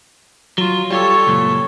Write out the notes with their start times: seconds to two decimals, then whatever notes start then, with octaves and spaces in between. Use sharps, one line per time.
0.58 F#3 F4
0.91 G3 F4 G4 A4 C#5
1.27 C#2 F#2 A#2